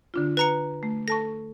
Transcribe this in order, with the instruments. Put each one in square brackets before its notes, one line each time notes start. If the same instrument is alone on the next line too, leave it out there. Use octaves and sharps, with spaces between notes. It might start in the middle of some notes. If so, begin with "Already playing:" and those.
[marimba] D3 D4 F4
[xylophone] B4 A#5 C#7
[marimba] A3
[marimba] A4 A5 C#6 [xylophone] A#6